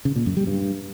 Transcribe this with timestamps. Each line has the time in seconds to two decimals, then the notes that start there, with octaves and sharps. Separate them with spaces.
0.05 C#3
0.16 A#2
0.26 F#2
0.37 G3
0.47 G2